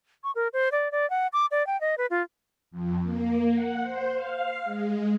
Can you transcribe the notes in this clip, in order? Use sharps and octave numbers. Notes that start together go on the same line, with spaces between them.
C#6
A#4
C5
D5
D5
F#5
D6
D5
G5
D#5
B4
F4
F2
A#3
F#5
C5
F5
G#3